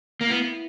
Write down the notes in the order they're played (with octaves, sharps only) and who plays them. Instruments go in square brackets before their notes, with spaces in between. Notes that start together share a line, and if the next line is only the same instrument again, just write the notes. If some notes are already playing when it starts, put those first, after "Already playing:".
[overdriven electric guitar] A#3
[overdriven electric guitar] B3 [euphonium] E4